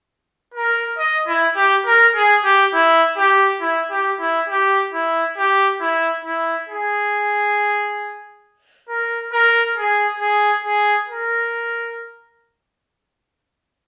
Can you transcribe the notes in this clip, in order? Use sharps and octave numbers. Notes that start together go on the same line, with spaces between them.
A#4
D#5
E4
G4
A#4
G#4
G4
E4
G4
E4
G4
E4
G4
E4
G4
E4
E4
G#4
A#4
A#4
G#4
G#4
G#4
A#4